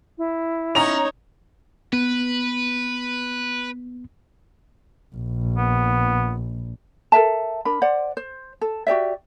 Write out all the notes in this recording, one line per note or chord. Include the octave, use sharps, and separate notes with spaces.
E4
C#4 D#4 C#5 A#5 F7
B3 B4
A#1
B3
A4 A#4 E5 A5
D4 A#4 B5
C5 D5 F#5
C5
A4
F#4 G4 D5 E5